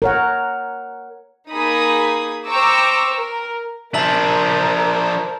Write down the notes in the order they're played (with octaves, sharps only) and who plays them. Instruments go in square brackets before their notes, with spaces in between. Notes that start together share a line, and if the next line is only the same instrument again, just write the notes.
[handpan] A#4 C#5 F#5
[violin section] A#3 D#4 G#4 B5 D#6
C5 G5 A#5 C#6 D6 E6
A#4
[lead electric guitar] F3 D4 [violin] A#4 [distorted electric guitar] C5 E5 [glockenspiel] A5 A#5 F#7